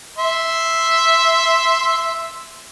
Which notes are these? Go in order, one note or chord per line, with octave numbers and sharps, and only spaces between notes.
E5 C6